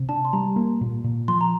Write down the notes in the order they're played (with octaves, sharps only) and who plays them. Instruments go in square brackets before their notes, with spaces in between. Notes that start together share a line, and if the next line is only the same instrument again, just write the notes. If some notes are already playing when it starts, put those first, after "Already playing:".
Already playing: [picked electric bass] C3
[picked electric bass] D4 [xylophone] A5
[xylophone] C6
[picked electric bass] G3 [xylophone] A#5
[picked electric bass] A#3
A#2
A#2
[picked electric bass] F3 [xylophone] C6
[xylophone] A#5